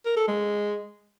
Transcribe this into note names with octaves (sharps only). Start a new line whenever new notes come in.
A#4
A4
G#3